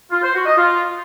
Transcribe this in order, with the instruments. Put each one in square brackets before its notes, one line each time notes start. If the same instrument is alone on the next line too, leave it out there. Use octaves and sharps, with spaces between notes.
[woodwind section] F4
C5
F#4
D#5
F4